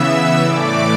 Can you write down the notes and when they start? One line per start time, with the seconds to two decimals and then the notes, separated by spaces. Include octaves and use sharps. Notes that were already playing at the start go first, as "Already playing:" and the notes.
Already playing: C#3 E3 B3 E5 E6
0.41 A2 E3 A3 D5 D6